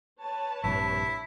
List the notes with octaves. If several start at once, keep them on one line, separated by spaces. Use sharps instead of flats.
B4 C#5 A5
A#1 G2 C3 E4